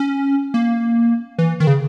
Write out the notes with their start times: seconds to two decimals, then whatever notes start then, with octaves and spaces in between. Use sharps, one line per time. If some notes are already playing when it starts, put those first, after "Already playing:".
Already playing: C#4
0.54 A#3
1.38 E3
1.60 D#3
1.67 C#3